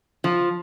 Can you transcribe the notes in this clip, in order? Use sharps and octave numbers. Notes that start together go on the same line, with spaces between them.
F3